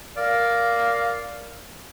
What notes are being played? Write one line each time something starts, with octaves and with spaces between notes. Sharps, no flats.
A#4 D5 F5